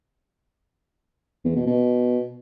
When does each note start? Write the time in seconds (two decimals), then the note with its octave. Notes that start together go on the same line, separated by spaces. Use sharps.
1.44 E2
1.55 B2
1.67 B2